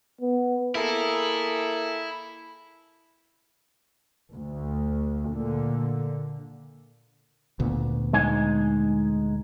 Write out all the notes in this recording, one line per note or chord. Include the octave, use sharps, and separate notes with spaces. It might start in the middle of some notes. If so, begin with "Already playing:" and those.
B3
A#3 E4 G#4 A4
D2
A#2 D3
D2 A#2 B3
G#3 D#4 G#5